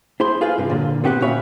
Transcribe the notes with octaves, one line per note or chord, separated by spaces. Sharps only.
E4 G#4 C5 C6
F4 G#4 B4 F5
G2 C3
A#2 D3
B3 C4 F#4 G4 D#5 F#5
A#2 C#4 C#5 E5 B5